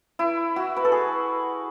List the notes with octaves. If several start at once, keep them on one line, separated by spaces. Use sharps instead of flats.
E4
F#4
B4
A4
G#4